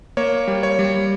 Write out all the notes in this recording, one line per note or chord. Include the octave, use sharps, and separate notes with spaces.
A#3 C#5
G3
C#5
G3